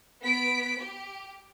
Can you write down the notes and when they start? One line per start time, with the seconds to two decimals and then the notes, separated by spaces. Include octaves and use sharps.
0.22 B3 B6 D7
0.80 G4